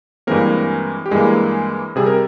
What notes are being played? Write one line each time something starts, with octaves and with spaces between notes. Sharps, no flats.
G2 E3 G#3 A#3 C4 A#4
G4
G2 E3 G#3 A#3 G#4
C3 G3 C4 G#4
A#4